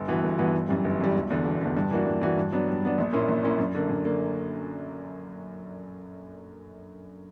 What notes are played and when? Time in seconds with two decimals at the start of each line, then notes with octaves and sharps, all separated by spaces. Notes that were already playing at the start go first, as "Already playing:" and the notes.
Already playing: G1
0.08 G2 E3 B3 F#4
0.24 G1
0.38 G2 E3 B3 F#4
0.54 G1
0.69 F#2 E3 G3
0.84 G1
1.00 F#2 E3 G3
1.15 E1
1.30 E2 D3
1.45 E1
1.61 E2 D3
1.77 G2
1.91 E3 A#3 D4 F#4
2.07 G2
2.21 E3 A#3 D4 F#4
2.37 G2
2.52 F#3 B3 D4
2.68 G2
2.83 F#3 B3 D4
2.98 A#1
3.13 A#2 A#3 C#4 E4
3.28 A#1
3.43 A#2 A#3 C#4 E4
3.59 F#2
3.75 D3 A#3
3.89 F#2
4.05 D3 A#3